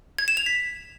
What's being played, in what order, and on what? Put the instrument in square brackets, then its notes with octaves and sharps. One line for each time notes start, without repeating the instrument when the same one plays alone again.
[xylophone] G#6
E7
F7
B6